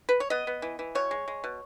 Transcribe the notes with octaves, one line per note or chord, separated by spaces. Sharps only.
B4
C#5
B3 D#5
B3
E3
E3
B2 C#5
G#3
G#3
B2